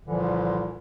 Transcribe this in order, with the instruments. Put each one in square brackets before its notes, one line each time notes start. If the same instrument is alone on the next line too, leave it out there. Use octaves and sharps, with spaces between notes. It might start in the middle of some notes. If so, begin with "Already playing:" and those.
[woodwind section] C2 A#2 D3 E3 F3